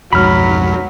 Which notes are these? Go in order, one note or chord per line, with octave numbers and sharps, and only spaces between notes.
B1 F2 G#2 F#3 B5 F6